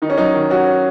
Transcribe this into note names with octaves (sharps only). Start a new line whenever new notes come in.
D#3 D#4
C#4
F#3 D#4
D#3
C#4 F#4
C#4